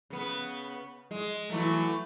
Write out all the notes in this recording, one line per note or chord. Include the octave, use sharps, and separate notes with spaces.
C#3 B3
G#3
E3 F#3 A3